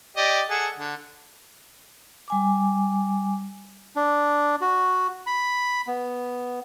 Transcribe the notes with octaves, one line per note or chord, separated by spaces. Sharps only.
G4 D5 D#5
G#4 A4 F#5
D3
G3 G#5 D6
D4
F#4
B5
B3